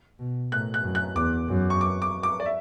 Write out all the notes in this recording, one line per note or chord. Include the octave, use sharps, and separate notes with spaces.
B2
A2 F#6
F#6
F#2
F#6
E2 D6
F#2
C#6
D6
D6
D6
D5
E5